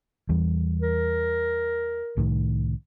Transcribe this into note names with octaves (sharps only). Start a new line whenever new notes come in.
E2 E3 G3
A#4
C2 A2 D#3